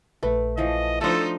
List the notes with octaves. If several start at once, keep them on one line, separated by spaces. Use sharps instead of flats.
A#1 A3 B4 E5
E3 F3 A3 D#5
F3 A3 D4 D#4 A4 C5